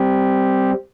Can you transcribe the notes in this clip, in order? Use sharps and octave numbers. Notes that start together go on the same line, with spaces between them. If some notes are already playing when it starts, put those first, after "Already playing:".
Already playing: G3 C4 G4